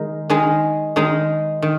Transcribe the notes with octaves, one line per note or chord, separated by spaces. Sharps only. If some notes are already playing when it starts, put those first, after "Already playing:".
Already playing: D#3 G#3 D#4 G#4
D#3 G#3 D#4 G#4
D#3 G#3 D#4 G#4
D#3